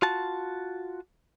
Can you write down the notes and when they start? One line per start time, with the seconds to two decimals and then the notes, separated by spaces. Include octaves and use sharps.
0.02 F4 F#4 A5